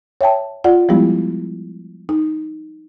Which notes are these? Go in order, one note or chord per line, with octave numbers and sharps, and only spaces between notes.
C#5 E5 G5 A5
F4 D5 F#5
F3 G3 G#3 B3 E4 G4
D#4